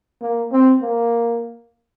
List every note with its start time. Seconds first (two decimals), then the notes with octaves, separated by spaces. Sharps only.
0.21 A#3
0.52 C4
0.81 A#3